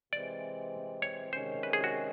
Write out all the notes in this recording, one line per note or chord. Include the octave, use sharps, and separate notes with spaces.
C3 E3 G#3 C4 D5
C#5
C3 D#3 G#3 C#4 C5
B4
G#4
F#4